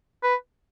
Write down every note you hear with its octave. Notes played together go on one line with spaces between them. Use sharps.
B4